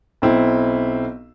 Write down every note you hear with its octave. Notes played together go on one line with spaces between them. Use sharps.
B1 C4 E4